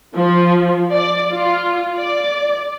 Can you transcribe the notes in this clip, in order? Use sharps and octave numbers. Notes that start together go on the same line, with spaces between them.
F3
D5
F4
D5